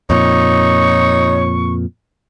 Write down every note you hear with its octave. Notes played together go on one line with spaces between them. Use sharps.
F2 A#2 D#4 C#5 C#6